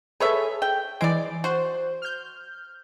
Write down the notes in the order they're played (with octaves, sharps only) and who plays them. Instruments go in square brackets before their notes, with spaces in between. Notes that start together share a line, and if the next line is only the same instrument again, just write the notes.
[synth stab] G#4 A4 [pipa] B4 C#5 E5
[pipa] G5
[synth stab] E3 D7 [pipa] G#3 D5
[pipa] F#4 [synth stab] C5
[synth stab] F6 G6